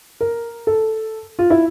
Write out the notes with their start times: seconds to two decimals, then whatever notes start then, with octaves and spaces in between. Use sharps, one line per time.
0.21 A#4
0.67 A4
1.39 F4
1.50 E4